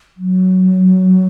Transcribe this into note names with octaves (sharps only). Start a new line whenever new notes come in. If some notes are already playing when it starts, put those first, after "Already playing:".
F#3